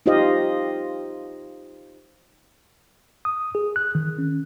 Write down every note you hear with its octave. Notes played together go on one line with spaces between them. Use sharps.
D#4 F4 G4 C5 D#5 F5
D#6
G#4
F#6
D#3
C#4